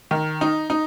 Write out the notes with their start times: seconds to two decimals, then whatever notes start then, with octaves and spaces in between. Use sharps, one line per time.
0.11 D#3
0.41 D#4
0.70 D#4